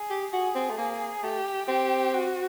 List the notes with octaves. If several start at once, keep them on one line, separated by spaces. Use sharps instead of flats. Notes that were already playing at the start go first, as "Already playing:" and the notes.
Already playing: G#4
G4
F#4 G#4
C4
A3
A#3
A3 G4
C4 G4
F#4